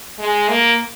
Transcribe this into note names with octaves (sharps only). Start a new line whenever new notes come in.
G#3
A#3